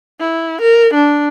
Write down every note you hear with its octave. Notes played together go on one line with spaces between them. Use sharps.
E4
A#4
D4